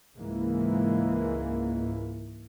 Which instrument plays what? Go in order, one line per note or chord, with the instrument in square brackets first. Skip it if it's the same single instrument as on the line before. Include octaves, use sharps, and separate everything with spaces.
[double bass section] C#2 G#2 E3 G#3 A#3